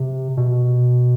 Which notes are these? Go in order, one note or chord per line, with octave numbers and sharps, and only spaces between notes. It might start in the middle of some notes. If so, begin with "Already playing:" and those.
Already playing: C3
B2